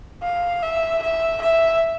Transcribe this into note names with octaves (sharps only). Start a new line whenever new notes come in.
F5
E5
E5
E5